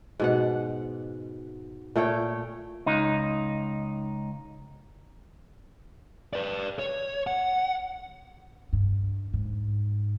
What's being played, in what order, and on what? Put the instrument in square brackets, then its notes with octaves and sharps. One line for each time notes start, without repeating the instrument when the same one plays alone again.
[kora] G#2 B2 F#5
A#2 A3 C#5 G5
[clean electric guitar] C#2 D#4
[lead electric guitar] B4 D5
C#5
F#5
[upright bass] G2
G#2